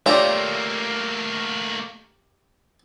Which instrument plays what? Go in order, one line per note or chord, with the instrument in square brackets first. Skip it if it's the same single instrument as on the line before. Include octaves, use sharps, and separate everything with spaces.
[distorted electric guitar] A3 A#3 [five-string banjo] F4 [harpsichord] G4 E5 A#5 [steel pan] C#5 D5